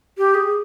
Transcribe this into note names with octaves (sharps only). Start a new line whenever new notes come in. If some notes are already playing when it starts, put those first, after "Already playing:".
G4
G#4